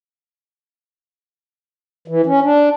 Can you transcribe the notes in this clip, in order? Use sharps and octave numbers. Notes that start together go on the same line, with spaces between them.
E3
C#4
D4